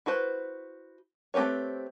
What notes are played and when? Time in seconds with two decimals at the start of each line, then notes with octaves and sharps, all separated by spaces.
0.06 E4 F#4 B4 C5
1.34 A3 C4 G4 B4 C#5